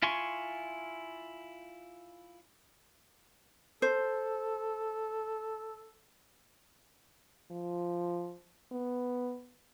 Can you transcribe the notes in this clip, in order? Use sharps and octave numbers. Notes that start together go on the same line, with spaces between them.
E4 F4 G#5 C6 C#6
A4 C5
F3
B3